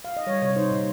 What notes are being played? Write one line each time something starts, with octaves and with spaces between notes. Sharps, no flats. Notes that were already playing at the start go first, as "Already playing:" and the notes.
F5
D#5
G3 C#5
C3 C#5
D#4 C5
A#2